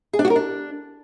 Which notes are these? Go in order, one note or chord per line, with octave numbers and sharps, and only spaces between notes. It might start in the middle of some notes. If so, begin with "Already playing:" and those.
G#4
D4
F#4
A#4
D4